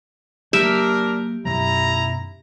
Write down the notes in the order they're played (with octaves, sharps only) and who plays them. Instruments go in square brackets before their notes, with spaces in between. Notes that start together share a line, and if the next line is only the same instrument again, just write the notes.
[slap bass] F#3 A#3 [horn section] D4 A#4 [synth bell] G4 [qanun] E5
[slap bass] F#2 B2 F#3 [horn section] E4 A#5